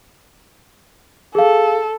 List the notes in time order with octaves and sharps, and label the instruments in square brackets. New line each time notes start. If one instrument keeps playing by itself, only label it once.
[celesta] G#4 F5 [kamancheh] A4